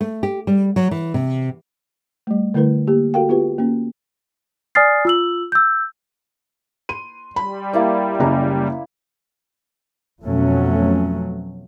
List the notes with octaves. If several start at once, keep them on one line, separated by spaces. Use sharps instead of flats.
A3
G4
G3
F#3
E3
C3
G3 A3
D3 A3 E4 A#4 B4
A#3 G4
F#4 A4 A#4 F5 G5
B3 F4 G4 B4
A#3 C#4
D5 G#5 D#6 F6 A6 C7
F4 E6 F#7
E6 G6
C6 D#7
G3 B5
A#3 E4 D5
F#1 C#3 A#5
F2 B2 F#3 A3 C#4